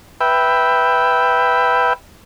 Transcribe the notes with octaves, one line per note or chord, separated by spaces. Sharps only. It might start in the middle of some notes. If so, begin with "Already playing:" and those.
B4 E5 G5